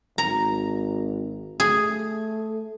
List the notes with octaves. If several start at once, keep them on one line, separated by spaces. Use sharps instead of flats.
G#1 A#5
A3 G#4